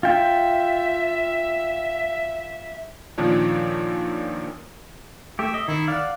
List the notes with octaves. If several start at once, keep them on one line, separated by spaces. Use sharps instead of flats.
F4 E5 G5
A#2 D#3 F3 D4 C#5
A3 G4 E5
D#5
D#3 E4
D5 F5 F#5